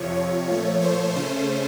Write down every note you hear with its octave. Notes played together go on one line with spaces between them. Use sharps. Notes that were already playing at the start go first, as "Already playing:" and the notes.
Already playing: F2 C3 F3 C#5
C#5
A#2 F3 A3
C5
C#3 A3 C#4 C5